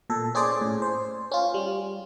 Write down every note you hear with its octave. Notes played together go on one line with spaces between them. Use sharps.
A#2 A4
C#4 G#4 C5 D5
A2
C5
C#4 F4
G3